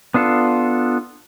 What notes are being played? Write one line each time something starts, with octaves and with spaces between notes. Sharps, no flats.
B3 D4 F4 A4